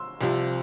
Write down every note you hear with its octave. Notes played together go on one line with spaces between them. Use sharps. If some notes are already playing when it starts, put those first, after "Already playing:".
Already playing: C6 E6
C2 C3 F3